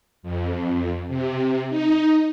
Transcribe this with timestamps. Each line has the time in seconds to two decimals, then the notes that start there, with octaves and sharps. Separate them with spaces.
0.23 F2
1.08 C3
1.70 D#4